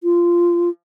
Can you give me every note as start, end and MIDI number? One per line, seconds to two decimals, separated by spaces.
0.04 0.69 65